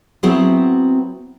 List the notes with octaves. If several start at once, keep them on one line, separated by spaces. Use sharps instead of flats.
F#3 B3 C4 E4 F#4 G#4